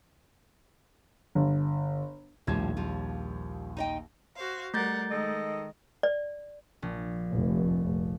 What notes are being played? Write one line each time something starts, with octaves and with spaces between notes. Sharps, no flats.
G1
A#1 D#2 A2 F3 G3 G#6
F3 G3 F4
D#4 D#5 G5
F#4 C5 F5
G3 A3 A#4 F#5 G6 A6
D#3 G#3 A4 D#5
D5
A#1
F1